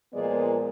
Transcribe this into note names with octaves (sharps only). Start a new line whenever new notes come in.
A#2 F3 G#3 B3 D5